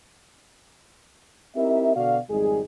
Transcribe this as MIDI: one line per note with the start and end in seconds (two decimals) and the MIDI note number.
1.56 1.95 60
1.56 1.95 63
1.56 1.95 64
1.56 1.95 67
1.56 1.95 70
1.56 1.95 76
1.96 2.18 47
1.96 2.18 50
1.96 2.18 66
1.96 2.18 74
1.96 2.18 77
2.30 2.60 32
2.30 2.60 41
2.30 2.60 55
2.30 2.60 56
2.30 2.60 63
2.30 2.60 68